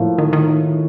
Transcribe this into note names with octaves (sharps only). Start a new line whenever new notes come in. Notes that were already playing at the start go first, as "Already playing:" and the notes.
Already playing: A2 F3 A#3
D#3
D#3